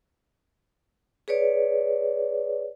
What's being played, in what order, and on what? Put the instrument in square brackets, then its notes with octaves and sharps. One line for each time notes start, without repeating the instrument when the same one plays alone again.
[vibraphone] G#4 B4 C#5 D5